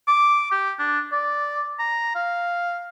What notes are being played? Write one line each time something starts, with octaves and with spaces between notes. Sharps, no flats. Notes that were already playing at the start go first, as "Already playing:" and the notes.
D6
G4
D4
D5
A#5
F5